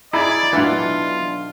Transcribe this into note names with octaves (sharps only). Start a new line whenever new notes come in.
D#4 E4 G#4 D5 A#5 B5 G#6
B1 E3 D4 F4 E5 F#5